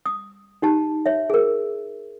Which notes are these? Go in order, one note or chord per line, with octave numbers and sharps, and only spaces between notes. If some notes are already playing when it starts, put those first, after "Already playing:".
D#6
D#4 G4 A5
C#5 E5
G#4 A#4